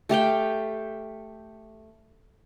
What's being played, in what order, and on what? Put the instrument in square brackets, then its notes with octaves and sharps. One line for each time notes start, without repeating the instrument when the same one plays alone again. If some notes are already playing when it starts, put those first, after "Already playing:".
[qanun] A3 G4 F5 G5